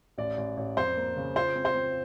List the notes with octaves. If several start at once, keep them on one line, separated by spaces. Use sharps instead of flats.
A1 D5
A1
A1
F2 C5
A#3
C#3
F4 C5
C4
C5
C4